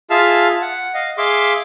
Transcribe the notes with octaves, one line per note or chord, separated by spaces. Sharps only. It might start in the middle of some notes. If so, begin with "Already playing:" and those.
F4 G#4 E5 F5 A5 F6
F#5
D#5 F5
G#4 E5 F5 C6 D6